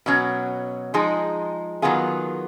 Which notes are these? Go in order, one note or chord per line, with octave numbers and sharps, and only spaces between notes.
B2 F#3 C#4 F#4
F3 G#3 D#4 G#4
D#3 F#3 B3 F4 G#4